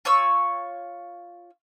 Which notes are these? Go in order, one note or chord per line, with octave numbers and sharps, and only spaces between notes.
F4 C#5 C#6 E6